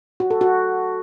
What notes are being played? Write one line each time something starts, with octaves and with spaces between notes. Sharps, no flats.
F#4
A4
F#4